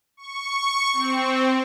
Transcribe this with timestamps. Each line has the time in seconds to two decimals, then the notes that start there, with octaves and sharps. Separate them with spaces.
0.17 C#6
0.93 C4